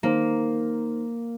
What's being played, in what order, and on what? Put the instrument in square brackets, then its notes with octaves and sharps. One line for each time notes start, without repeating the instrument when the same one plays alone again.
[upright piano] D#3 C5 [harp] A#3